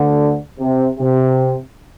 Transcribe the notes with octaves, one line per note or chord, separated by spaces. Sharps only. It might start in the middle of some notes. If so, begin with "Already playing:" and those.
Already playing: D2 D3
C3
C3